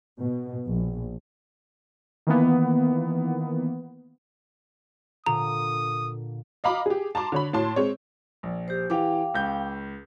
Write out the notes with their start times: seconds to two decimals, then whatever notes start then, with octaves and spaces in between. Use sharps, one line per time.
0.19 B2
0.67 A#1
2.27 D#3 E3 A#3 B3
5.26 A#2 D3 A#5 D#6
6.64 D#5 F5 A#5 B5 D6
6.86 G4 G#4
7.15 A5 A#5 C6 D6
7.32 D3 C#5 B5
7.53 A2 A5 C6
7.76 G#3 C4 C#5
8.43 A#1
8.68 G4 C5
8.90 E3 G4 F5 G5 D6
9.34 C#2 G6